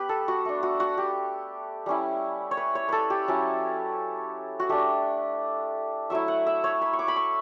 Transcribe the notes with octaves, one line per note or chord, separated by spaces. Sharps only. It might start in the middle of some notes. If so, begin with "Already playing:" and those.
Already playing: B3 G4 B4
A4
F#4
A3 D4
F#4
F#4
G4
G3 C#4 E4
C#5
B4
C#5
A4 B4
G4
F#3 C#4 E4
F#4
A3 D4 G4
F#3 A3 E4 E5
F#5
E5
C#5
B5
C#6
D6
B5
C#6